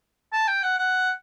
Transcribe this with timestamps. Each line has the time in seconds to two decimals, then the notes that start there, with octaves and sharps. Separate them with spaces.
0.33 A5
0.48 G5
0.63 F#5
0.78 F#5